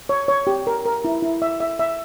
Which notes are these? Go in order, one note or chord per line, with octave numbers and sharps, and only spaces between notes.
C#5
C#5
G4
A#4
A#4
E4
E4
E5
E5
E5